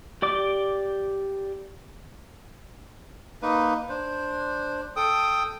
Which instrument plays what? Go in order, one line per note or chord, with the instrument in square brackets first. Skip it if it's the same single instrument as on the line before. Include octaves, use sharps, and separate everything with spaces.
[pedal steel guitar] G4 D5 D6
[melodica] A#3 D#4 B4
D4 C5
A4 G5 D#6